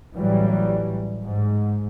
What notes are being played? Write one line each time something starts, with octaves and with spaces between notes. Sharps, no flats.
A1 E3 F#3 G3
G#2